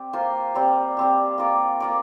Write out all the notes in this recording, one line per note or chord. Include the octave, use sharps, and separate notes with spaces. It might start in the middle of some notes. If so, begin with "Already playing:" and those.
Already playing: C4 G4 D5
A#3 F4 C5
G3 C4 G4
G3 C4 G4
A#3 F4 D5
A#3 F4 D5